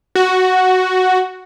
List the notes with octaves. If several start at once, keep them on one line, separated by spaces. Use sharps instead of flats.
F#4